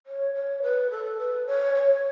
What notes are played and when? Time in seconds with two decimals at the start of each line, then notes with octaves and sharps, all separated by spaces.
0.07 C#5
0.35 C#5
0.63 B4
0.91 A4
1.19 B4
1.47 C#5
1.75 C#5